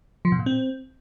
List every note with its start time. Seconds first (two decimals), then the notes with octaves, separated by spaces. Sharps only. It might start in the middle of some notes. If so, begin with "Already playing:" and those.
0.25 F3
0.32 B2
0.39 A#2
0.46 C4